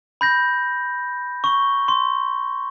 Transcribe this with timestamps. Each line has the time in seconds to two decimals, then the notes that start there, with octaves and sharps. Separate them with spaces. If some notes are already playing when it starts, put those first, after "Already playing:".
0.21 B5 G6 A#6
1.44 C#6 G7
1.88 C6